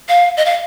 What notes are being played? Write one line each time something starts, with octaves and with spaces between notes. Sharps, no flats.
F5
D#5
F5